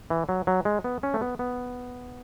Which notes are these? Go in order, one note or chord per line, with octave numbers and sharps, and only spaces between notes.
E3
F#3
F#3
G#3
B3
C#4
A3
B3
B3